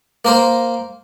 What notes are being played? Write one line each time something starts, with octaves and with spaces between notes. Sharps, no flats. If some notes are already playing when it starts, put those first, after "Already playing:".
A#3 A#4 C5